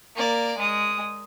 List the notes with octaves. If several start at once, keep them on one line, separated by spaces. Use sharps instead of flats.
A#3 D5
G#3 D#6